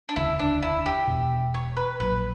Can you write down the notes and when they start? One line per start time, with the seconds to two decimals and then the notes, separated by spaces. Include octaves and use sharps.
0.09 D4
0.16 E1 D2 C#3 E4
0.39 D4
0.62 E4
0.86 G4
1.07 E1 E2 B2
1.54 C#5
1.77 B4
2.00 A#1 A#2 F#3 B4